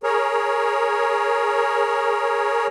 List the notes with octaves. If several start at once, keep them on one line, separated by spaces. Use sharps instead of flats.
G#4 A#4 C#5